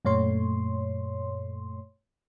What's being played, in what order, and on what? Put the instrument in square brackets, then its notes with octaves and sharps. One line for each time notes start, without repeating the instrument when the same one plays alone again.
[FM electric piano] F#2 A#2 A3 C#5 C6